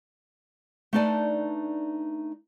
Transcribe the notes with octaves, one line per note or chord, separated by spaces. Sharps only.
A3 D4 D#4 B4 D5 A5